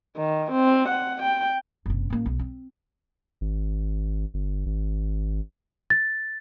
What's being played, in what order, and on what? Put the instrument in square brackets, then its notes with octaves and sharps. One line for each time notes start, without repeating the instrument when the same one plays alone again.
[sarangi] D#3
C4
F#5
G5
[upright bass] F#1 C3
A1 A#3
B1
C4
[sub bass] G#1
G1
G#1
[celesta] A6